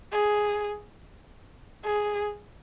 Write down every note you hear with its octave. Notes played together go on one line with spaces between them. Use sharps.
G#4
G#4